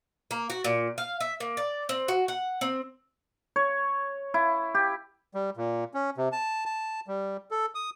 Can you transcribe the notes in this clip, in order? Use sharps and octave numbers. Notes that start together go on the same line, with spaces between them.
A#3
F#4
A#2
F5
E5
A#3
D5
C4
F#4
F#5
C4
C#5
E4
G4
G3
A#2
C#4
C3
A5
A5
G3
A4
D#6